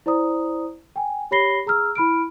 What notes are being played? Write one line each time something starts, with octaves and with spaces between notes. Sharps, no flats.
E4 C5 D5 A#5 D#6
G5 G#5
G4 C#5 B5 A#6 C7 G7
G#4 A#5 E6 F6
E4 B5 F6 D7